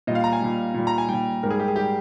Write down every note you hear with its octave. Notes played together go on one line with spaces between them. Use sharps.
A#2 G3 D#5
F5
A#5
G#5
A#2 G3
A#2 G3
A#5
G#5
A#2 G3 G5
G#2 G3 A#4
G#4
G4
G#4
G3 G4